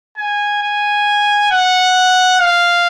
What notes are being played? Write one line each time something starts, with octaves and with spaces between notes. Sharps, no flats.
G#5
G#5
F#5
F5